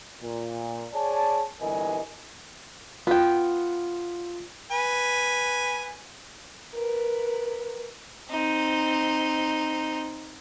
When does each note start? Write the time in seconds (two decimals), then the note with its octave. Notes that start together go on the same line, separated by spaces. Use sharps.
0.21 A#2
0.93 G#4 C#5 D5 G#5 A5
1.60 G1 C2 E3 A#4 D#5 G#5
3.07 B3 F4 G5
4.71 B4 G#5
6.74 A#4 B4
8.29 C4 D#4